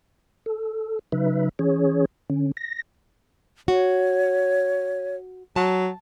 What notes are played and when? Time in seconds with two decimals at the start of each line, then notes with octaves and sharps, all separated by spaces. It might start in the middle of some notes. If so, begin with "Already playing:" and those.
0.46 A4
1.12 C#3 F#3 D#4 B4 E5
1.59 E3 C#4 G#4 C#5
2.30 D3 C#4
2.57 A#6
3.68 F#4 C#5
5.56 F#3 A5